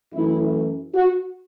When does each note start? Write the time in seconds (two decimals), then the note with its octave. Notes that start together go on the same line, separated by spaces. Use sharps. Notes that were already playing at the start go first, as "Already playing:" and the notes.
0.13 F#2 E3 A3 E4
0.94 F#4